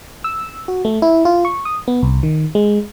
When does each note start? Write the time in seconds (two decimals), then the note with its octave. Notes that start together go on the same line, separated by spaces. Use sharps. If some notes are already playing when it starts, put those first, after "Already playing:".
0.24 E6
0.68 F#4
0.85 A3
1.02 E4
1.25 F4
1.45 C#6
1.65 D#6
1.88 B3
2.03 C2
2.23 D#3
2.55 G#3